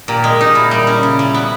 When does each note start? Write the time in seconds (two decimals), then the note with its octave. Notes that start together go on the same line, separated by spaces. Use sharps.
0.08 A#2 G4 A#4
0.24 G#3
0.41 D#4
0.55 A#2 E4
0.71 G3
0.87 C#4
1.03 C#3 E4
1.19 G3
1.34 B3